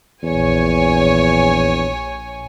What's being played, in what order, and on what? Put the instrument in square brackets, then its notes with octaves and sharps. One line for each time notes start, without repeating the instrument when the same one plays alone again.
[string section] A#1 C#5 G#5 [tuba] E2